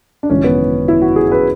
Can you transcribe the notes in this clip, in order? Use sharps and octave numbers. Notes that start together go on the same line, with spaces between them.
D4
G#1 F#2 C#3 E3 C#4
B3
E4
F#4
G#4
B4